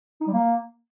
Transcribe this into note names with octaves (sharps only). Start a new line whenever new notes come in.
D#4
G3
A#3